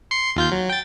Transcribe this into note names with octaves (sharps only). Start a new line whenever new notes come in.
C6 C7 C#7
D#2 F4 G6
F#3
G5 A6